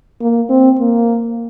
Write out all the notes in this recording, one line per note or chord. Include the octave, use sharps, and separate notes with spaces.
A#3
C4
A#3